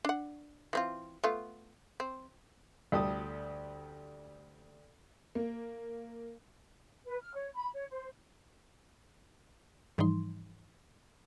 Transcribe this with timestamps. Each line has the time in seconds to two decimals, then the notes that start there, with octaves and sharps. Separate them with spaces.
0.05 D4 F#5
0.73 E3 C4 F4
1.24 A3 B3 F4
2.00 C4
2.92 D2 G3 A4 D#6
5.35 A#3
7.05 B4
7.21 F6
7.34 C#5
7.54 B5
7.73 C#5
7.90 C5
9.98 G#2 E3 F3 G3 D#4 C6